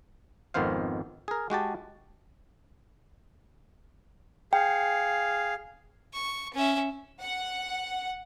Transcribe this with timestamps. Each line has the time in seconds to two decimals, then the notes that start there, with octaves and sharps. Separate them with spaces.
0.54 G#1 F2 D#3 B3 C5 F5
1.28 G#4 A#4
1.50 G#3 F#4 G4 A5
4.53 G#4 F5 G5
6.14 C#6
6.54 C#4 E5
7.19 F#5